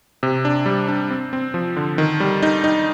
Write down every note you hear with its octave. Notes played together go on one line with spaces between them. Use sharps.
C3
D4
G3
D4
C4
C4
F3
D3
D#3
G3
D#4
D#4